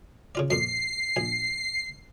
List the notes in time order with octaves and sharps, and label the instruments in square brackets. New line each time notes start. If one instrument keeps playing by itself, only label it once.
[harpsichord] C#3 F4 D5
[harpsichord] F2 A#2 [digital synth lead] C7
[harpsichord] A#1 G#5